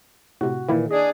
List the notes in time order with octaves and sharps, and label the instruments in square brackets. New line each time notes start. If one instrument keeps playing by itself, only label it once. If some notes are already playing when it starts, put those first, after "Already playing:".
[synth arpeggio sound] A2 C3 [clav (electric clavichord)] F#4
[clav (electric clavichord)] A#2 E3 [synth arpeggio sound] D#3 A#3 E4
[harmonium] D4 G#4 [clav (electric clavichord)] D#5